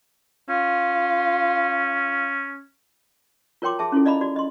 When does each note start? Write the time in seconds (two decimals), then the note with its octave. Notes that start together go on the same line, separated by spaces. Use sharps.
0.49 C#4 F4
3.62 F4 A#4 C#5 G5 C6 D6
3.79 G#4 E5 A5
3.92 C#4 E4 F4 A4
4.05 D5 D#5 F5 A#5 B5
4.21 F#4 D5
4.36 D#5 C6